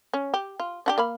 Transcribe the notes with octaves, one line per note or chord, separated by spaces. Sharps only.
C#4
G4
F4
D4 F#4 G4
A#3 F5 B5